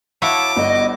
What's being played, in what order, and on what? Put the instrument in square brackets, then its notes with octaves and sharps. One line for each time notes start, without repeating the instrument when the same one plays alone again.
[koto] E4 F#4 C#5 [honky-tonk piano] F5 [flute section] A5 [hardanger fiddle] D6
[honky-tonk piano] G1 [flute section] D#5